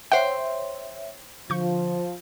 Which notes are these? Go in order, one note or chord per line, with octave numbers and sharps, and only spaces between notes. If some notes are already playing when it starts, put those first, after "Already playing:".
C5 C#5 E5 F#5 G5
D3 F3 C#6 G6